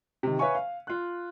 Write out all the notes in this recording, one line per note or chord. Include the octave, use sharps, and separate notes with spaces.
C3 D#3
B4 C#5 E5 F5 G#5 C#6
F5
F4 F#6